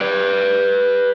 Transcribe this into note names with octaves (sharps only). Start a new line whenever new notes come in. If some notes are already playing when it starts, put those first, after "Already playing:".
B4 D5